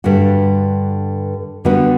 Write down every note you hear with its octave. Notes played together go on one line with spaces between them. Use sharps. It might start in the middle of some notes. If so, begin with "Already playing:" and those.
G2 D3 G3 D4 F#4
D3 G3 B3 D4 F#4